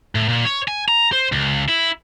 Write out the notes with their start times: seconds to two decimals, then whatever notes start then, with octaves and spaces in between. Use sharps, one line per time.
0.15 A2
0.29 A#2
0.45 C#5
0.68 G#5
0.88 A#5
1.13 C5
1.32 C#2
1.69 E4